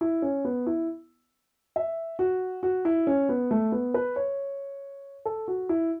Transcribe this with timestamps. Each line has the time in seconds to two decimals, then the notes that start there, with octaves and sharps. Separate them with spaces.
0.01 E4
0.22 C#4
0.45 B3
0.67 E4
1.76 E5
2.19 F#4
2.63 F#4
2.85 E4
3.07 C#4
3.29 B3
3.51 A3
3.72 B3
3.94 B4
4.16 C#5
5.25 A4
5.48 F#4
5.69 E4